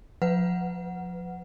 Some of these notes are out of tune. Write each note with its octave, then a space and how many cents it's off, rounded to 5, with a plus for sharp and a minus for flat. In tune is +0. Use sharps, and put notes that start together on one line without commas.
F3 +35 B4 +30 F#5 +0